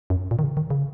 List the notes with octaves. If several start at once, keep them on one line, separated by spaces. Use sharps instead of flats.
F#2
A#2
D#3
C#3
D#3
C#3